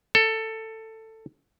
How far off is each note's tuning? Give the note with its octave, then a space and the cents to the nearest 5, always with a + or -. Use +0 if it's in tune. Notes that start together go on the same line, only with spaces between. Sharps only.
A4 +15